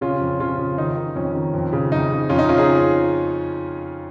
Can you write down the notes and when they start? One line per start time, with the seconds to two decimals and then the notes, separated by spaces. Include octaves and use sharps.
0.01 C#3 C#4 F4
0.20 F2
0.40 C#3 C#4 F4
0.58 C#3
0.77 D#3 D#4
0.96 D#3
1.15 F2 C#4
1.35 D#3
1.54 F2
1.73 C#3
1.92 F2 D#4
2.11 C#3
2.29 F2 C#4 F4
2.39 D#4
2.49 C#3 C#4 F4
2.58 D#4 G#4